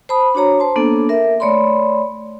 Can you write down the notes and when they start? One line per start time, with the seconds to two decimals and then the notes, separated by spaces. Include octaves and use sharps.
0.09 C5 A5 B5 D#6
0.35 D4 F#4 C#5 A#5
0.59 C5 A5 C6
0.76 A#3 B3 D4 A4
1.09 A#4 E5
1.40 A3 C#5 D5 B5 C6